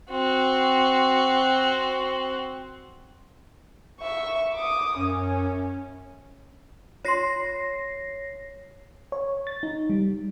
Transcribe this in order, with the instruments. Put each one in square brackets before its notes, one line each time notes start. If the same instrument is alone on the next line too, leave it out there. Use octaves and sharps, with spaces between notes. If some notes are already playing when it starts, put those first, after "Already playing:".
[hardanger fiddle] C4 F#4
[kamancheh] E5 C#6
D6 D#6
[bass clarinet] F#2 [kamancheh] C#4
[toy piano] F4 C6 [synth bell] C#5 A#6 C7
[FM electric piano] C#5
A6
D#4
G3